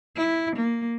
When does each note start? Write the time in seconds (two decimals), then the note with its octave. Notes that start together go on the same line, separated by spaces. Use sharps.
0.16 E4
0.56 A#3